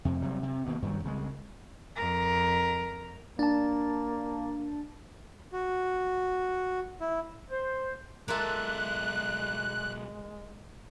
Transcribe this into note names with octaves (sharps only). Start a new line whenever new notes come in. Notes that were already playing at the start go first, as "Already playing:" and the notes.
F2 C3
C3 F#3 G3
C3
G2 B2 D#3 A#3
G2 D#3 F#3
C2 C#3 E3 G#3
F2 A#4
A#3 D4 A5
F#4
E4
C5
B1 G#3 A#3 F4 A4 E5 F#6